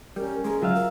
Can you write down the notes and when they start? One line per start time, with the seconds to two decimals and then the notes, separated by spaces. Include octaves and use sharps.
0.16 G3 C#4 A#4
0.44 G#3 G#4 A#4
0.62 F#3 F4 E5 F5
0.75 A#4